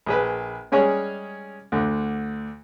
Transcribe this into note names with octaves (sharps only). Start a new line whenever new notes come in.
A#1 G#4 B4
G3 G#3 C#4 G#4 C#5
D2 D3